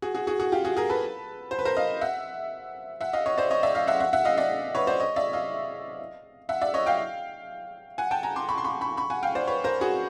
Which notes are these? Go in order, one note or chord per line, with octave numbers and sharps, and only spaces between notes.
F#4 G#4
F#4 G#4
F#4 G#4
F#4 G#4
F4 G4
F#4 G#4
G#4 A#4
A4 B4
C5
B4
A#4 C5
D#5 F5
E5 F#5
E5 F#5
D#5 F5
C#5 D#5
C5 D5
C#5 D#5
D5 E5
D#5 F5
E5 F#5
E5 F#5
E5 F#5
D#5 F5
D5 E5
B4 C#5
C5 D5
C#5 D#5
D5 E5
D#5 F5
E5 F#5
D5 E5
C#5 D#5
F5 G5
F#5 G#5
G5 A5
G#5 A#5
C6 D6
B5 C#6
C6
B5 C#6
B5 C#6
B5 C#6
F#5 G#5
F5 G5
C5 D5
B4 C#5
A#4 C5
F#4 G#4